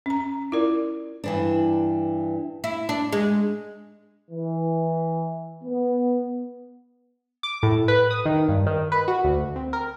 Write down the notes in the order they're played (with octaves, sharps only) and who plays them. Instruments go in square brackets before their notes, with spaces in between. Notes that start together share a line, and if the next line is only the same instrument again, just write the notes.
[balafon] C#4 A#5
E4 F4 A#4 D5
[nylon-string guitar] G2 E3 D4
[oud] E4
D4
G#3
[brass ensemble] E3
B3
[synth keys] D6
A2
B4
D#6
D#3
G2
D#3
B4
F#4
D2
C4
A#4